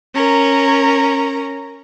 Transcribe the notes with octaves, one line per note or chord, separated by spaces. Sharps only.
C#4 A#4 A#5